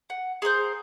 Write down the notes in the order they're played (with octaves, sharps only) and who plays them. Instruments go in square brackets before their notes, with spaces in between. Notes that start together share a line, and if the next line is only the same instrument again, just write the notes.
[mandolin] F#5
G#4 A#4 C5 G6